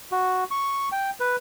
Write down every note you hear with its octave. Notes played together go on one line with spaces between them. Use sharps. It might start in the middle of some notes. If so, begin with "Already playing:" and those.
F#4
C#6
G5
B4